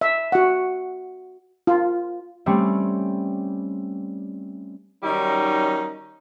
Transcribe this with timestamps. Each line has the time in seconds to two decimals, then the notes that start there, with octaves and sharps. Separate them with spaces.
0.01 E5
0.32 F#4 F#5
1.67 F4
2.46 G3 A3 C4 C#4
5.03 D#3 F#3 G3 C#4 D#4